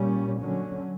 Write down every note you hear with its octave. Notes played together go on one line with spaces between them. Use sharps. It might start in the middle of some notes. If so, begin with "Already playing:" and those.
Already playing: A#2 G3 C#4
D3 F#3 C#4